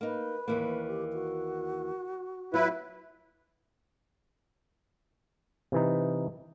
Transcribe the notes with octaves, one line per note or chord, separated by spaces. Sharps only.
A#3 D#4 B4
D#2 E3 A#3
G4
F#4
F#3 B3 E4 F4 B4
C3 E3 D#4